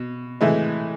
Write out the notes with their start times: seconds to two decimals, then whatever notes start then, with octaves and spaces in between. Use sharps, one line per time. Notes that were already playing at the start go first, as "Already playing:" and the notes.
Already playing: B2
0.41 A2 E3 G#3